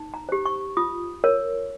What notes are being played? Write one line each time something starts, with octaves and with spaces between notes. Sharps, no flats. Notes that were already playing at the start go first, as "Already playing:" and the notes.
Already playing: D#4
A#5
G4 C5
C#6
F4 D#6
A#4 C#5